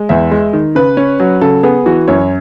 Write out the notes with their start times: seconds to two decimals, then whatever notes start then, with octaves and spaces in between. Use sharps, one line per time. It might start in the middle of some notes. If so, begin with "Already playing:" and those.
Already playing: G#3
0.09 E2 E5
0.31 G#3
0.53 D#3
0.75 C#3 B4
0.97 C#4
1.20 F#3
1.41 C#3 A4
1.63 B3 G#4
1.86 E3 F#4
2.08 F#2 C#5